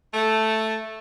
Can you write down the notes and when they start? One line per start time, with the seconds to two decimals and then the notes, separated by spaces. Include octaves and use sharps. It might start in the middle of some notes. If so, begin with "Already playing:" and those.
0.14 A3